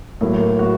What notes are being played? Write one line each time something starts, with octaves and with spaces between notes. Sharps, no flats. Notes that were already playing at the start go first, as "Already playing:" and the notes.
A2 F#3 A#3 A#4
F#4